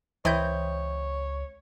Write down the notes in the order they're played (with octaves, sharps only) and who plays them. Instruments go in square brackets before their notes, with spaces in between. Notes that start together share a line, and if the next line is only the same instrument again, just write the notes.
[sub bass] C#2 [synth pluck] E3 G6 [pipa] C4 E4 D#5 [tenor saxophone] C#5